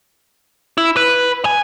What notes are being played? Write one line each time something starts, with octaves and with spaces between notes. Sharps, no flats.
E4
B4
G#5